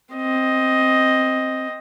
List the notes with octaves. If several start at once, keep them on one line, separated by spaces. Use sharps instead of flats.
C4 D#5